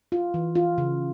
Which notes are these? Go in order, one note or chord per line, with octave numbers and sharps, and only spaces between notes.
F4
E3
F4
C#3